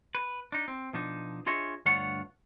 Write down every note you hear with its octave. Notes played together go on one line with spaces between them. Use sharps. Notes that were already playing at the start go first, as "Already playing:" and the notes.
B4
D4 D#4
C4
B2 F3 D4 D#4
D4 F4 G#4 C#5 D#5 E5
D2 G2 D4 F4 C#5 F#5